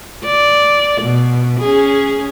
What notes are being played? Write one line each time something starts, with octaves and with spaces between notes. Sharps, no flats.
D5
B2
C#4 G#4